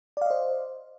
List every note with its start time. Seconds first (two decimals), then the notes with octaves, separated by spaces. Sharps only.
0.17 D5
0.21 F5
0.26 D#5
0.30 C5